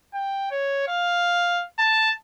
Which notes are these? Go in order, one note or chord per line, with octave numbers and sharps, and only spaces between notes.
G5
C#5
F5
A5